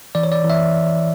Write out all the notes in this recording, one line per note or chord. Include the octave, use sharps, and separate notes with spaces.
E3 D5
C#5
D5
E3
E5